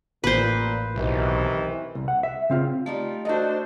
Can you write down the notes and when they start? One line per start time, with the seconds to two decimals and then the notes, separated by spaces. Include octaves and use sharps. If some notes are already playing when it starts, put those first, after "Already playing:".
0.24 A1 A#2 B4 C5
0.96 B1 C3 D#3 E3
1.95 C2
2.08 F#5
2.23 E5
2.50 C#3 C4 F4
2.86 G3 A3 D#4 F4 D5
3.25 D4 F#4 A4 C5 D#5